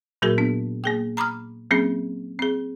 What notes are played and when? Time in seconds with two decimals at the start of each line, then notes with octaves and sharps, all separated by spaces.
0.22 A#2 F#3 A#3 F#4 G#4 A#4
0.38 B3 D4
0.84 A#3 G#4 G5
1.17 A#5 B5 D6 D#6 F6
1.71 F#3 A#3 C4 C#4 G#4
2.39 C4 G#4